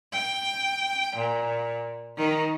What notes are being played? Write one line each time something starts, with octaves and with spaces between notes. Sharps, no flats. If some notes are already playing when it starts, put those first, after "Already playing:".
G5
A#2
D#3